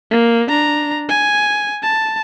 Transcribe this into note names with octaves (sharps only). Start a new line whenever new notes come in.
A#3
D4 A#5
G#5
A5